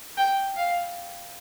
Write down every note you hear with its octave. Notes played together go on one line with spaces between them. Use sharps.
G5
F5